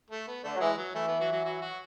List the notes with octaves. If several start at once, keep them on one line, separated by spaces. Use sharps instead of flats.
A3
B3
D3 A3
F#3
E3 G#3
F#3
E3 A3
B3
F#3 F#4
F#3 F#4
F#3 F#4
F#3 F#4